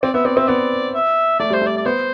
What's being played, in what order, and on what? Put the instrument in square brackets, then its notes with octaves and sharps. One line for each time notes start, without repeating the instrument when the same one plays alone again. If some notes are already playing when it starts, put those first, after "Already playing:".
[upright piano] C4 [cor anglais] D5
[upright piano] B3 [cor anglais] E5
[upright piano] C4 [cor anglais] D5
[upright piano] C4 [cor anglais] E5
[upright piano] B3 [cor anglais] D5
[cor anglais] E5
[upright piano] A3 [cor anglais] D5
[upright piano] G3 [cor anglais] C5
[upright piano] A3
[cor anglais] D5
D5
[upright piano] B3 [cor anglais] C5